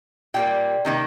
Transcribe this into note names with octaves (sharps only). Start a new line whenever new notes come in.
A#2 G3 A#3 G5
C3 D#3 A#3